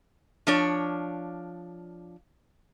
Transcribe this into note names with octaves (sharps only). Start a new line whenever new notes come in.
F3 D4 C#5